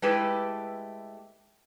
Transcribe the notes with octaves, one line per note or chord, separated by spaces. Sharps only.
G#3 A3 E4 G4 A4 B4